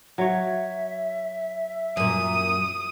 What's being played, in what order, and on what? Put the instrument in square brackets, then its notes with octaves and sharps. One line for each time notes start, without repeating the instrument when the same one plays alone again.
[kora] F#3 C#5 [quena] E5
[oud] F#2 A#2 [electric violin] D#6